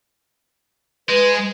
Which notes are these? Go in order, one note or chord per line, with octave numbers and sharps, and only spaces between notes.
G#3 B4